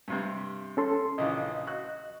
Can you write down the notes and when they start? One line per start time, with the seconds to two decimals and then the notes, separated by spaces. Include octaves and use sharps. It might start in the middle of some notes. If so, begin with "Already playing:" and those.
0.08 G2 C3 G3
0.77 C#4 A4 C6
1.18 A#1 C#3 E3 D#5
1.67 F#4 F#6